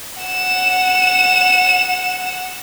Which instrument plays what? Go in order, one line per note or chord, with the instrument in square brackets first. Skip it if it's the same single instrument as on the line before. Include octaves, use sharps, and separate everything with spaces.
[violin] F#5 E7